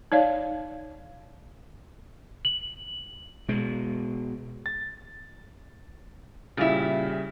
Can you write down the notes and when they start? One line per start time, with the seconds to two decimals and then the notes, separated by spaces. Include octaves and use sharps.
0.12 D#4 C#5 D5 F5
2.45 F#7
3.49 B2 G#3
4.66 A6
6.57 A#2 C#3 G3 E4 E5